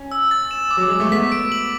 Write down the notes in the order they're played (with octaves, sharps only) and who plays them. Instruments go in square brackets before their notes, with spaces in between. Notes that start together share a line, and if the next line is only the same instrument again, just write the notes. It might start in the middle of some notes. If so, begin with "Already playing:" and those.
Already playing: [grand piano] C#4
[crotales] E6
A6
E7
D6
[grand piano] F#3
[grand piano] G#3 [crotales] D6
[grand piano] A3
[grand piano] B3 [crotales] B6
[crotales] D7
F#7